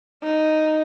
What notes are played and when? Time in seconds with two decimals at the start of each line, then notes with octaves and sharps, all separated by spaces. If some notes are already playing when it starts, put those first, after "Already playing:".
0.23 D#4